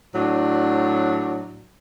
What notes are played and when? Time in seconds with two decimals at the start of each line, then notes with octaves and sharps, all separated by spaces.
0.15 A2 F#3 D4